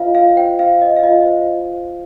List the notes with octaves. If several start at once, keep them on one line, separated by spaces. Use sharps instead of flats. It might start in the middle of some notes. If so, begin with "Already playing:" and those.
Already playing: F4 C5 D#5 F5
F4 F5
C5 G5
C5 F5
C5 D#5
F5
F4 D#5
C5 F5
F4
C5